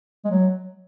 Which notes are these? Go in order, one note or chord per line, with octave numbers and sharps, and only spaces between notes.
G#3
F#3